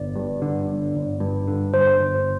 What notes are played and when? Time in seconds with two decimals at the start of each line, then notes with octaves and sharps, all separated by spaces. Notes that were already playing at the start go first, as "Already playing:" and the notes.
Already playing: G1 D5
0.15 G2
0.42 D3
0.68 G1
0.95 G1
1.20 G2
1.48 D3
1.73 G1 C5
2.00 G1